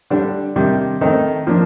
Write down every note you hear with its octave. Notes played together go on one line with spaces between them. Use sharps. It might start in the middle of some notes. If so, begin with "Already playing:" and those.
D3 G3 D4
C3 D#3 G3 D4
D#3 A3 C4 D#4
F3 A#3 D4